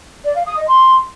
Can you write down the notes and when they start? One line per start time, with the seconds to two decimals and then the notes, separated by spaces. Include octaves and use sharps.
0.25 D5
0.36 F5
0.46 D#6
0.57 D#5
0.68 C6